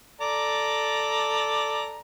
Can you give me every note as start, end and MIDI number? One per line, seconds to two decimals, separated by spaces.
0.21 2.01 69
0.21 2.01 74
0.21 2.01 82